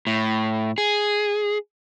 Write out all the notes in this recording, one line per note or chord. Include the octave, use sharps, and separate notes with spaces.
A2
G#4